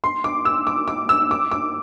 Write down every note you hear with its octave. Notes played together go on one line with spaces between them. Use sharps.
C6
D6
E6
D6
D6
E6
D6
D6